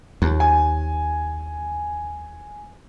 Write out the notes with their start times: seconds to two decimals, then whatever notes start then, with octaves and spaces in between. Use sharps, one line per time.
0.22 D#2
0.40 G#5